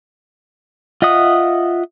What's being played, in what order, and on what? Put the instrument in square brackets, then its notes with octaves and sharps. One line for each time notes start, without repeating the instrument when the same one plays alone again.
[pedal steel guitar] F4 D#5 E5 F#5 D#6